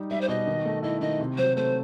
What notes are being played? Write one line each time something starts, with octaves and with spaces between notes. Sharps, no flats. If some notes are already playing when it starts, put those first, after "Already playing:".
Already playing: G3 D#4
G3 E5
C5
B2 D#5
D#3
A3
E4 D#5
D#3 D#5
C3
F#3 C5
A3 C5